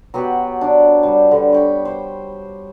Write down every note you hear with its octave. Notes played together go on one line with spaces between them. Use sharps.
F#3 B3 G4 F#5
D4
G3
D3
B4 C#5 G5
C5